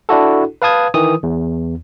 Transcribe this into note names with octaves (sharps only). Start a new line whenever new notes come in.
D4 E4 F#4 A4
B4 F5 A5 D#6 G#6
D#3 E3 D#6
E2